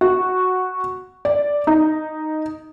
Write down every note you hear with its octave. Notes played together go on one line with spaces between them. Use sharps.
F#4
D5
D#4